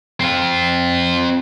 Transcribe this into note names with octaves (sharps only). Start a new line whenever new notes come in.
C4 F4